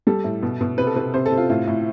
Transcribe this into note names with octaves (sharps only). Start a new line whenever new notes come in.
G3 A4
A2
B2
B2
C3 B4
A4
C3 B4
C3 C5
A4
C3
F4
A2 F4
A2